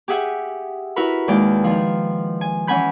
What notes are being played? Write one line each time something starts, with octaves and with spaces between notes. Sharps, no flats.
G4 G#4 E5 F#5 G#5
E4 F#4 A#4 B4 B5
D#2 G#3 D5 G5
D#3 F3
G#5
E3 C#4 F#5 G#5 B5 G6